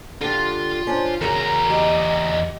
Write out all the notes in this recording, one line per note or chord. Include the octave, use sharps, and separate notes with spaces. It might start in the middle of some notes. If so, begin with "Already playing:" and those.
D3 F4 G4
C#4 D4 C5
E2 C#3 F#3 A#4 A#5
G4 D#5